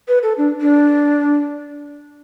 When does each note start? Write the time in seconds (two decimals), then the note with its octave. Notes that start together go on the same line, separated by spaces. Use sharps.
0.08 B4
0.23 A4
0.38 D4
0.61 D4